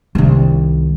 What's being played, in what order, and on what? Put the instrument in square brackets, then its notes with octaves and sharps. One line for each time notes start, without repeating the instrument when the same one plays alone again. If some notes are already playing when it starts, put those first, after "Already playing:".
[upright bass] C2 D#3